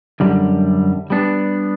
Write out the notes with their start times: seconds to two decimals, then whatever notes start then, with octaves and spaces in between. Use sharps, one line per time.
0.20 F#2 D3 G3
1.10 G3 B3 D4